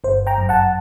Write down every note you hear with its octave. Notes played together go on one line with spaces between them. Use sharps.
G1 C5
G5 A#5
F#2
F#5 A5